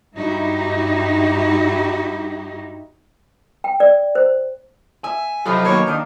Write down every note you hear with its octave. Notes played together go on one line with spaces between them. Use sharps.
G2 D#4 E4 F#4 G4
G5
D5
C5
E5 G#5
C3 F3 F#3 A4 B4 D#5
B2 D#3 A#3 D#4 A#4 C#5
D#3 D4 F5 D#6